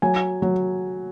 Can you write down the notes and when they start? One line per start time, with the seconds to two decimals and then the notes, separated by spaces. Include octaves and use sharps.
0.02 F#3 G#5
0.42 F#3